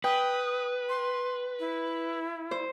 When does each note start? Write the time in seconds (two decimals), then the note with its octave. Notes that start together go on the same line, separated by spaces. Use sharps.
0.04 B4 G5 D#6
0.89 C6
1.59 E4
2.51 C5